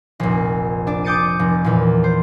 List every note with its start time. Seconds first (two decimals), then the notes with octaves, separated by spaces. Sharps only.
0.20 F1 A#1
0.87 D4 D5
1.04 D6 D#6 G6 A6 C#7 D#7
1.39 F1
1.64 E2 A#2
2.04 C5